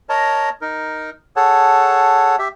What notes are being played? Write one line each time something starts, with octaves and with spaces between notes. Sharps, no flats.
A#4 C#5 D#5 A5 A#5
D#4 A#4
G#4 A4 C#5 F#5 A5
G4 E5